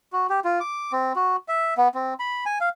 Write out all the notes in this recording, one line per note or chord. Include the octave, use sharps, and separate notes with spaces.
F#4
G4
F4
D6
C4
F#4
E5
B3
C4
B5
G#5
F5